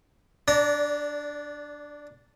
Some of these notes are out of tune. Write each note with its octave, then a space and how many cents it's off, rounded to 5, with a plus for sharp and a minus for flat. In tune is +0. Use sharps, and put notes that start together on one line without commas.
D4 +0 D5 -25 A#5 +0